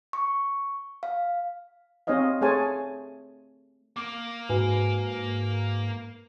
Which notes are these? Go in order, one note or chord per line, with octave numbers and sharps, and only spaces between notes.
C#6
F5
C4 D#4 C#5 D#5 F5
A3 G#4 C5 C#5 G#5 A5
A#3 D6
G#2 F#4 B4 G#5